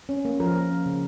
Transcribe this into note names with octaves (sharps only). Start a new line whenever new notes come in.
C#4
A#3
F3 A#4
A#3
C#4
C#3